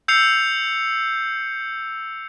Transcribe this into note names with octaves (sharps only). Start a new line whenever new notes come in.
E6 G6 C7 C#7 F7